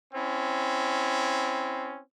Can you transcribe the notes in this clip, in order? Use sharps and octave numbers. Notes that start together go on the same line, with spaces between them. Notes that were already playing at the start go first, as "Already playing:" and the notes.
C4 C#4 E4